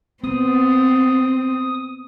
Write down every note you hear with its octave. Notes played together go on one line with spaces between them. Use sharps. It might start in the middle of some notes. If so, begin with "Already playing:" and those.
B3 C4 D#6